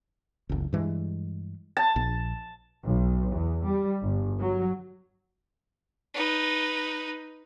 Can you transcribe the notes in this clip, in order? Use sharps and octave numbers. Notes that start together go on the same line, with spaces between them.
F#1 C#2
G2 E3 G#3
A5
A#1
B1
E2
G3
G1
F#3
D#4 B4